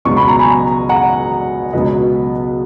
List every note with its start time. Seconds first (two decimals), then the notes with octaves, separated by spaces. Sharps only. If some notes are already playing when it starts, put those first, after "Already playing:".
0.05 C#2 B2 F#3 B3 C#6
0.17 B5
0.28 A#5
0.39 G#5 B5
0.89 F#5 A#5
1.73 C#2 B2 F#3 B3 B4 D#5